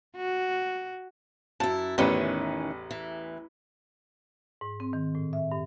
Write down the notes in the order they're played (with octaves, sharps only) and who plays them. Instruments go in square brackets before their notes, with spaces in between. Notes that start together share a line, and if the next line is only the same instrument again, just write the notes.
[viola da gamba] F#4
[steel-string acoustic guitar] F#2 E4 [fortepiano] A5
[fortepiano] A1 E2 B4 [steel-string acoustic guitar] D#3 E3 C#4
[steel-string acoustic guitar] E3
[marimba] G#2
C4
D#3
A2
E5
G2